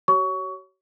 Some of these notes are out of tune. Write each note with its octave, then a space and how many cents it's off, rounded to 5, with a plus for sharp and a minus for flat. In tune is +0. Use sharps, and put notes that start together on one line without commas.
F#4 +45 C#5 +0 C#6 +25